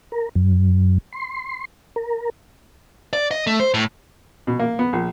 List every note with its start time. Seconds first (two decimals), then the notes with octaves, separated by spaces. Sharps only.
0.12 A#4
0.35 F#2
1.13 C6
1.96 A#4
3.13 D5
3.31 D#5
3.47 A3
3.60 C5
3.74 A2
4.47 B2
4.59 A#3
4.79 B3
4.93 A#1